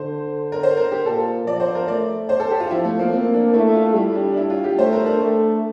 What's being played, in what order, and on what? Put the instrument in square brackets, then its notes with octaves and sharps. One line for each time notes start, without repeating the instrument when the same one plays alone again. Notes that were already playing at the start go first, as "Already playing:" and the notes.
Already playing: [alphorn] D3 [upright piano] C5
[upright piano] A#4
C5
A#4
G4
[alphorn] A#2 [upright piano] A4
[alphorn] F3 [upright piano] D5
[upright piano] C5
A#4
[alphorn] A3 [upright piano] D5
[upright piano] C5
A4
G4
F4
[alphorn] F3 [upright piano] E4
[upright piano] A3
A#3
[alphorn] A#3 [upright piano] C4
[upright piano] D4
[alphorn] A3 [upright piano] E4
[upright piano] F4
[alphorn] G3 [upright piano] E4
[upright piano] D4
D4
E4
F4
G4
[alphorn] A3 [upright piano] C5
[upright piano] A#4
D4
[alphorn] A3